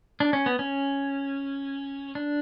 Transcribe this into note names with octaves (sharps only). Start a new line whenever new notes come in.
D4
C#4
B3
C#4
D4